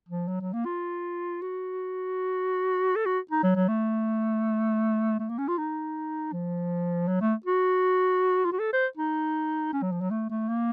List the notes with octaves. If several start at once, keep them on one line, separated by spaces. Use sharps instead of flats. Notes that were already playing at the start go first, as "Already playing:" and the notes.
F3
F#3
F#3
A#3
F4
F#4
A4
F#4
D#4
F#3
F#3
A3
A3
A#3
C#4
F4
D#4
F3
F#3
A3
F#4
F4
F#4
A4
C5
D#4
C#4
F#3
F3
F#3
A3
A3
A#3